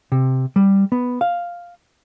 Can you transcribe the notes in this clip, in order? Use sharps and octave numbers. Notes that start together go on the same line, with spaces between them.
C3
G3
B3
F5